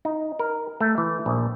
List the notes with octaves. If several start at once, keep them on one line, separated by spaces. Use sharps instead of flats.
D#4
A#4
A3
E3
A#1